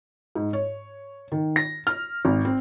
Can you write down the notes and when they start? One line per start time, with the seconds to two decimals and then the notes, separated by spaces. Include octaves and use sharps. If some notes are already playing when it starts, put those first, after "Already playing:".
0.35 G#2
0.53 C#5
1.32 D#3
1.56 A#6
1.87 F6
2.25 G#1
2.45 C4